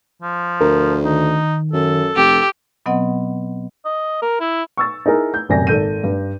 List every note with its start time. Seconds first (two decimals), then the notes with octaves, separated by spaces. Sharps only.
0.22 F3
0.61 D2 A#4
1.05 D#3 D#4
1.73 F#2 A4
2.16 F1 G4
2.86 B2 F#3 B3 C4 D#5 F#5
3.85 D#5
4.22 A#4
4.40 E4
4.77 C#6 E6 A6
5.06 D#4 E4 G#4 A#4
5.34 G6
5.49 D#1 F#2 C3 D5 G#5 A#6
5.67 G#1 A4 G6 D#7
6.04 G2